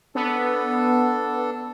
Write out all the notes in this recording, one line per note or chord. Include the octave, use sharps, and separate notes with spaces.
B3 D4 A4